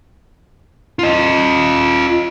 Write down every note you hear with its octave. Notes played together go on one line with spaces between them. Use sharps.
F4 D#5